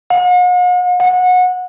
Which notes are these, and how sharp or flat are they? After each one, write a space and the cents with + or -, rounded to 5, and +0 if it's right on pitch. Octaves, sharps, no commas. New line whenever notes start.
F#5 -45
F#5 -25